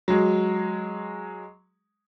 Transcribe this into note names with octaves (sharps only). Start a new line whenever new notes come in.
F#3 G#3